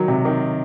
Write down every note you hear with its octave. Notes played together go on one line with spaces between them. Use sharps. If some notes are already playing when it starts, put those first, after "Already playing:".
Already playing: D#3 F#3
C3
D#3